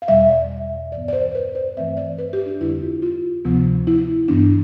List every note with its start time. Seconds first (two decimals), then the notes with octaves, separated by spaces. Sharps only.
0.02 F5
0.08 E2 B2 G3 E5
0.29 D5
0.92 G2 E3 B3 D5
1.08 D5
1.13 C5
1.35 B4
1.55 C5
1.77 G2 E3 A3 C4 E5
1.97 D5
2.18 B4
2.33 G4
2.46 D4
2.60 F2 D3 G3 C4 E4
2.82 F4
3.02 F4
3.45 D2 C3 F3 B3
3.87 E4
4.28 G2 E3 B3 D4